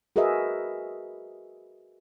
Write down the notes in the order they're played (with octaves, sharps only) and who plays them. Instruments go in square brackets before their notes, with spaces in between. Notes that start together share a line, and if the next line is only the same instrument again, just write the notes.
[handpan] F#4 G#4 A#4 B4 D#5 E5